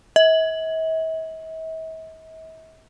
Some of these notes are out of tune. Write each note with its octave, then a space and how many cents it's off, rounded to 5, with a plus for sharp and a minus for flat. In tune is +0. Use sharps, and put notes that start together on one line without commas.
E5 -45